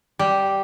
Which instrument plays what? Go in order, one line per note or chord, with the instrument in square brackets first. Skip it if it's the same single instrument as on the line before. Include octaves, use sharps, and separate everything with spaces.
[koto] G3